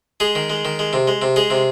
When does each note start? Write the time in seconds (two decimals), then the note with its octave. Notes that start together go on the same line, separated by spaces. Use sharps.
0.20 G#3 G#4
0.35 D#3
0.50 G#3
0.65 D#3
0.79 G#3
0.93 C3
1.07 G#3
1.22 C3
1.36 G#3 G#4
1.50 C3